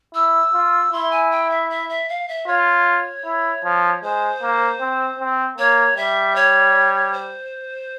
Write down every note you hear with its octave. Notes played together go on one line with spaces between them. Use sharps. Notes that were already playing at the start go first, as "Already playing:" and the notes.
E4 E6
F4
E4 C6
G#5
G5
E5
E5
E5
F5
E5
F4 C#5
E4
F3
G#3 C5
A#3
C4
C4
A#3 C#5
G3 E5
C#5
C5